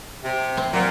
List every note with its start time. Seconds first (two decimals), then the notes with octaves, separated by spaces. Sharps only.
0.24 C3
0.57 C4
0.73 A#2 F#3